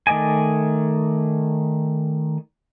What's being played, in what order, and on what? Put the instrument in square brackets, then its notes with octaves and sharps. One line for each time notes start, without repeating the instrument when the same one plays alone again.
[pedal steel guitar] D#3 A3 D5 D#5 G#5